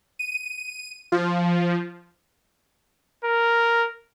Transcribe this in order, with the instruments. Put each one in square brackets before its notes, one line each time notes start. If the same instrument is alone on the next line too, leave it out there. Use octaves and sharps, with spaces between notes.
[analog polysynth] D#7
F3
[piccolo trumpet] A#4